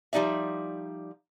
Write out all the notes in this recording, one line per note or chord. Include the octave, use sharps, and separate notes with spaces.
F3 G3 D#4 D5 E5